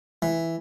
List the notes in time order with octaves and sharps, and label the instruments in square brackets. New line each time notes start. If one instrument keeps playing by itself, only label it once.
[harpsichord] E3